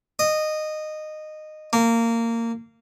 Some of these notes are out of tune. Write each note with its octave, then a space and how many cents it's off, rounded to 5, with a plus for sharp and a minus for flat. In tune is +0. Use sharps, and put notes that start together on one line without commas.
D#5 -15
A#3 -20